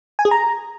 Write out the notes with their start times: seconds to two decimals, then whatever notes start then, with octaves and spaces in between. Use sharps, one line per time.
0.19 G#5
0.25 G#4
0.31 A#5